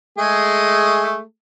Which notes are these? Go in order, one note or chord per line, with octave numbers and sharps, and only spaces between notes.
G#3 A3 G#4